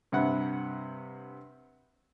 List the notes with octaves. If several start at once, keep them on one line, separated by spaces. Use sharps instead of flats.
G2 C3 F#5 B5